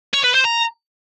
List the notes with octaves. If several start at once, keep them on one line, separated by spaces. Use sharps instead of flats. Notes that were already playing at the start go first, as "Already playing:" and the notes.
C#5
B4
C5
A#5